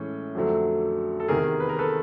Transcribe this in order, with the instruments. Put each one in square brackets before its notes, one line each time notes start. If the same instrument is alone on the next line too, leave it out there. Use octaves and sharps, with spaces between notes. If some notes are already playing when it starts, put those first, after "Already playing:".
Already playing: [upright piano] A2 E3 G#3 C#4
F2 D3 F#3 A3
[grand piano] A4
[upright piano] E2 C3 D#3 [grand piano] G#4 A#4
[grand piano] B4
A#4
A4 B4